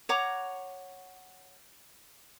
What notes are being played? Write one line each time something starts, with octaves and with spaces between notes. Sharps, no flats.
C#5 F#5 A#5 D6